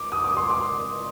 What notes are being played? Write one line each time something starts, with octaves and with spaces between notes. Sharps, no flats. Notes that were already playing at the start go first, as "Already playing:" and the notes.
Already playing: D6
D#6
D6
C6
D6